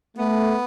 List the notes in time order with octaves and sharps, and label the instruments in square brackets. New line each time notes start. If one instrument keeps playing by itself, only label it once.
[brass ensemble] A3 [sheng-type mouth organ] B3